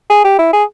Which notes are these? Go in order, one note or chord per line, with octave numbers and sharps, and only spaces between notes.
G#4
G4
E4
G#4